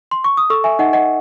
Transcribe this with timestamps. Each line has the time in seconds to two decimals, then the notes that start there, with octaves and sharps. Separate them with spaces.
0.11 C6
0.24 C#6
0.37 D#6
0.50 A4 C#6 E6
0.64 E5 G#5
0.79 D#4 D#5 F#5
0.93 D#5 F#5